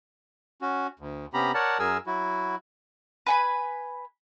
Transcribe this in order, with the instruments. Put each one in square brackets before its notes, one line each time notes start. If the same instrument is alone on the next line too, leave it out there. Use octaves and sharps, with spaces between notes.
[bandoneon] C#4 F#4
D2
C3 B3 C#4 G4 A#5 B5
A#4 C#5 D5 F#5 A5
F#2 F#3 G#4 A#4 G#5 E6
F#3 E4 F#4
[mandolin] B4 G#5 B5